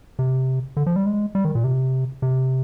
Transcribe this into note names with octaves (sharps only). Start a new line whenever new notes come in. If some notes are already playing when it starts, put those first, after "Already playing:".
C3
D3
F3
G3
G#3
G3
D#3
A#2
C3
C3